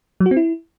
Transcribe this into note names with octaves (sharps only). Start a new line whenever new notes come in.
F#3
F#4
C4
E4